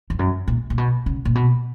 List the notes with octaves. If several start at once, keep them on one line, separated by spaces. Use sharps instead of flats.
F2
F#2
A#2
A#2
B2
C#3
A#2
B2